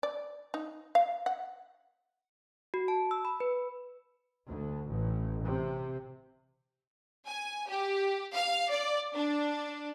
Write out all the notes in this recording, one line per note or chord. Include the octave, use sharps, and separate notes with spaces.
D5
D#4
F5
F#5
F#4
A5
E6
B5
B4
D2
A1
C3
G#5
G4
F5
D5
D4